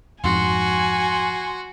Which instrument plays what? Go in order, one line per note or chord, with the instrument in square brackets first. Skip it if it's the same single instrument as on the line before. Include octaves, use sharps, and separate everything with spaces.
[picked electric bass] F2 G#2 [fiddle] F#4 [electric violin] G#5 [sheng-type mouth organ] C6